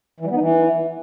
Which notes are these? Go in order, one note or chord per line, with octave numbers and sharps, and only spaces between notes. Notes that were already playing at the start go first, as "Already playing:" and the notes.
E3
G3
B3
D#4
E3